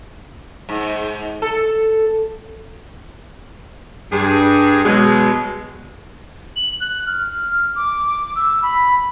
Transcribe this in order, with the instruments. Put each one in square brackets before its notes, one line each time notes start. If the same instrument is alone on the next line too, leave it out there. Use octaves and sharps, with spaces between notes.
[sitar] G#2
A4
[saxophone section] G2 G#4
B2 F#3 G#3
[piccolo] F#7
F#6
F6
D6
E6
B5